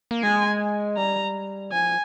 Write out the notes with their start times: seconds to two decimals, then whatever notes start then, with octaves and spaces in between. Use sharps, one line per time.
0.11 A#3
0.23 G#3 G#5
0.97 G3 A#5
1.72 F3 G#5